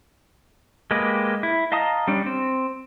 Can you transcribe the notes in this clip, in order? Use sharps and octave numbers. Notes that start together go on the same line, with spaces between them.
G#3 A#3 G4 B4 D#5
E4
D#5 F5 A5 A#5 D#6
G3 C#4 D4
C4